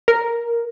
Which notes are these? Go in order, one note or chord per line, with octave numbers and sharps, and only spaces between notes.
A#4